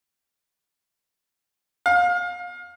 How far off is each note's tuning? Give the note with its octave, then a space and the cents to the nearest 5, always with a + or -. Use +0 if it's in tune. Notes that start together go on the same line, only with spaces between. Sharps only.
F5 +30